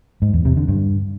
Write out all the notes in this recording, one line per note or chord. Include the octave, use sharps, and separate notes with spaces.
G#2
E2
C3
D3
G2